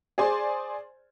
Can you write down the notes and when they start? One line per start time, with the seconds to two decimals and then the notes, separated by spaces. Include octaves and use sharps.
0.18 G#4 C5 D5 G#5 C6